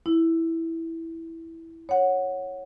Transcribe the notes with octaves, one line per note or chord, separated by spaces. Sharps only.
E4
C#5 F#5